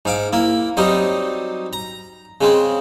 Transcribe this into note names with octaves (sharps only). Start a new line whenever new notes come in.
G#2 F5 D6
A#3 E4
F#3 G3 C4 D#4
A#5
C#3 G#3 C4